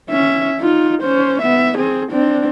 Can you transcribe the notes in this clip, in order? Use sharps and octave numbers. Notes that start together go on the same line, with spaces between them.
C#4 E5
D#4 F4
C#4 C5
B3 E5
C4 G#4
C4 D4